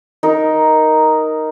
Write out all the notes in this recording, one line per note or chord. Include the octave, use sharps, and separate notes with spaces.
D#4 A#4